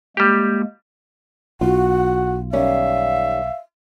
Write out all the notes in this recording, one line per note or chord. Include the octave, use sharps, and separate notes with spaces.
G3 G#3 A#3 G4
B1 F4 F#4 F#5
D#3 G3 C#4 E5 F5